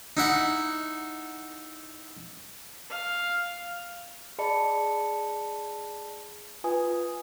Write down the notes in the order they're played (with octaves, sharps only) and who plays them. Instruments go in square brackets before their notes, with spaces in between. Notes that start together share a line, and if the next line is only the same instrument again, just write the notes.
[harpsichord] D#4 E4 F#5
[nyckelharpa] F5
[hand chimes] G#4 D5 D#5 A5 B5 C#7
F4 B4 G#5 D#6